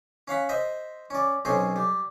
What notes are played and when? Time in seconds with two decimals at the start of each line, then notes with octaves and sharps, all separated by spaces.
0.28 C#4 F5 F#5 B5
0.49 C5 D#5 E5
1.10 C#4 D5
1.45 B1 C4 C#4 G#4 C6
1.76 G3